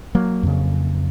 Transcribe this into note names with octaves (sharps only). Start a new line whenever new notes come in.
F#3 A#3
F2 C#3